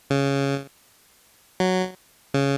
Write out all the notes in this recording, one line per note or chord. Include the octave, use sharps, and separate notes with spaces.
C#3
F#3
C#3